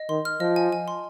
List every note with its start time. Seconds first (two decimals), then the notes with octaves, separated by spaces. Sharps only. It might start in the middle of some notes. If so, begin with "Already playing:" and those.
Already playing: D#5
0.09 D#3 C6
0.25 F6
0.40 F3 D#5
0.56 G#5
0.72 G#5
0.88 C6